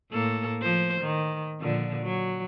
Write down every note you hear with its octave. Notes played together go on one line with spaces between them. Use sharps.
A2 A#3 A4
F3 C5
D#3
A#2 D3 F3
F#3